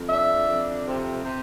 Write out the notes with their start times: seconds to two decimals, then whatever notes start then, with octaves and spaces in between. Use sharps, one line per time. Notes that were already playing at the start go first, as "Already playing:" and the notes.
Already playing: F2
0.09 D4 E5
0.48 F2
0.86 C3
1.24 C3